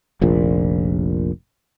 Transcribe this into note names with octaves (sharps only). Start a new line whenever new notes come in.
F1 A#1 A#2